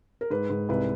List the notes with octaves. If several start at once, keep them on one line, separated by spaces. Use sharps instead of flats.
A#4
G#2 B4
G#2
C2 B4